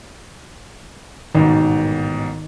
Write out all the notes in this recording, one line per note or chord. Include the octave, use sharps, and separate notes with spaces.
A1 G#2 B2 D#3